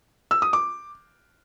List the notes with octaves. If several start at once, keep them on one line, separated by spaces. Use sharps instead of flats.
E6
D#6
D6